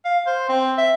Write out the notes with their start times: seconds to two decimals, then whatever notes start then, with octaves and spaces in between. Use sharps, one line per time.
0.05 F5
0.27 C5
0.49 C4
0.78 E5